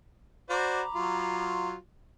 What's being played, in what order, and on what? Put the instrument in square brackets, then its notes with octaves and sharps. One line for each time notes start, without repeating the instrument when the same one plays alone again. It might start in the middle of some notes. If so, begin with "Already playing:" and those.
[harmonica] F#4 C5 D5 [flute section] A#5 B5 D6
[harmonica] F#3 F4